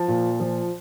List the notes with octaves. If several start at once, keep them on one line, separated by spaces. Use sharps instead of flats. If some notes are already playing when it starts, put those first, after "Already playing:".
Already playing: F3 A5
A#2
F3